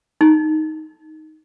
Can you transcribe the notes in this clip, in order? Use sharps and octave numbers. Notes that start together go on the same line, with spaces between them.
D#4